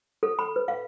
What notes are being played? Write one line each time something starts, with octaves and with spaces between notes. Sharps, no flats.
A4
B5
B4
F5